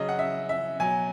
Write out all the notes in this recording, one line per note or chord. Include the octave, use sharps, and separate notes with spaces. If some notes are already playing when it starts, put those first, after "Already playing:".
Already playing: C#3 F#3 D#5
F#5
E5
E5
B2 F#3 G#5